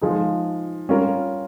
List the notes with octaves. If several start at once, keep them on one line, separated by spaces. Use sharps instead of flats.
F3 G#3 D#4 G#4
G3 C#4 F4 A#4